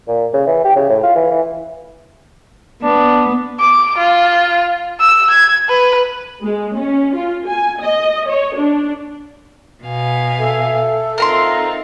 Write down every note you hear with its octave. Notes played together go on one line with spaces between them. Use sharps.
A#2
C#3
E3
G4
C#3
A2
F4
E3
E3
B3 D4
D6
F4
E6
G#6
B4
G#3
C#4
F4
G#5
D#5
C#5
D4
B2 F5 G#5
A4 E5
C4 D#4 F4 A#4 A#5 C6